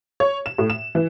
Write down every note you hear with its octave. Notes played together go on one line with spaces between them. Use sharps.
C#5
E7
A2
E7
E3